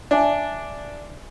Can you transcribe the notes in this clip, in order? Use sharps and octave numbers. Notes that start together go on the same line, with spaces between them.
D4 E5 G#5 A5